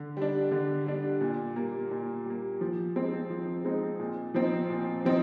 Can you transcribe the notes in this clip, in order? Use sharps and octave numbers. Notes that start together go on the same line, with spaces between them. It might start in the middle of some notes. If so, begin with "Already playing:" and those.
Already playing: D3
G3 D4
D3
G3 D4
A#2
G3 A#3
A#2
G3 A#3
F3
G#3 C4 D#4
F3
G#3 C4 D#4
A#2
F3 C4 D#4
A#2
F3 C4 D#4